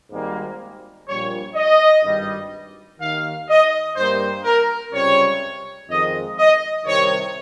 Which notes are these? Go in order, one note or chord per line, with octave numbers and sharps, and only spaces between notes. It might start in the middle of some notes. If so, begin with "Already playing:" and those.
G#1 G#2 G3 A#3
A#1 A#2 G3 C#5
D#5
G#1 G2 G3
D#2 D#3 A#3 F5
D#5
G2 G3 A#3 C5
A#4
C#2 C3 G3 C#5
F2 D#3 G#3 D#5
D#5
C2 C3 D#3 C#5